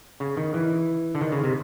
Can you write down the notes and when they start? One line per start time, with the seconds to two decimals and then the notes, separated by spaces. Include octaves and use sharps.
0.20 C#3
0.37 D#3
0.54 E3
1.15 D3
1.21 D#3
1.32 C#3
1.44 C3